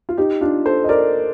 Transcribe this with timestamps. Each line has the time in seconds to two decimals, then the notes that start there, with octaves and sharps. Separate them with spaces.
0.09 F4
0.18 D#4 G4
0.41 D4 F4
0.66 A4 C5
0.84 D#5
0.89 A#4 D5